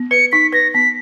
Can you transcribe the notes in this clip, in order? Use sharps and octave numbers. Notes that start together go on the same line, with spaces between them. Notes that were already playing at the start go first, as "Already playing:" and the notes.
Already playing: B3
B4 C#7
D#4 B6
B4 A#6
B3 B6